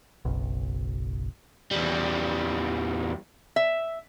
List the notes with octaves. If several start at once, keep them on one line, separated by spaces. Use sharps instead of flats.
F#1 B1
E2 G3
E5